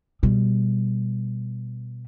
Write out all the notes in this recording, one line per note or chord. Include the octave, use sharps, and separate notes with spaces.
B2 G3